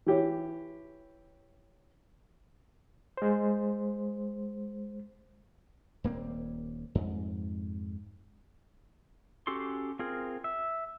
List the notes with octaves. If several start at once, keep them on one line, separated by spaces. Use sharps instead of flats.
E3 G4 C#5
G#3 C5
D#1 A#3 C4
F2 G#2
C#4 F#4 G4 A4 C6
C4 F4 G#4 A#4
E5